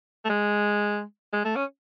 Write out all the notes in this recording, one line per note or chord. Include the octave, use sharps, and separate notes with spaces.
A3
G#3
G#3
A3
C#4